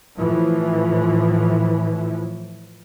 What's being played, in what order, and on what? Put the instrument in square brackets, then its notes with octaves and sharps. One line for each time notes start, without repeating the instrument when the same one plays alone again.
[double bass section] A2 E3 F3